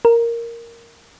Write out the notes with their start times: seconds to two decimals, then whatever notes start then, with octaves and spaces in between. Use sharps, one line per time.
0.05 A#4